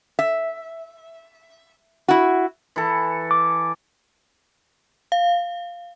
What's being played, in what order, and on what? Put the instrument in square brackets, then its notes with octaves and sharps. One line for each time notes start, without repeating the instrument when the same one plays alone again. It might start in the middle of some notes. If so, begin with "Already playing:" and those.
[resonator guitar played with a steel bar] E5
E4 F#4
[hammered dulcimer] E3 A4
[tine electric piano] D6
[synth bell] F5